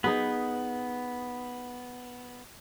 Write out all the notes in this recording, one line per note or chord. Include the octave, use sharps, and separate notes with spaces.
B3 D#4 G#4 B4